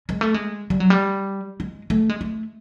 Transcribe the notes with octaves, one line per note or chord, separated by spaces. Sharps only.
G#3
A3
G#3
G3
F#3
G3
G#3
A3
G#3
A3